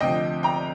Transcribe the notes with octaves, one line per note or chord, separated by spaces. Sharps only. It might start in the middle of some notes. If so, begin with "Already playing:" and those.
D2 C3 F3 D#5 G5
G5 A#5